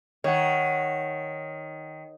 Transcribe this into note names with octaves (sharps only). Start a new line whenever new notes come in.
D#3 C#5 F#5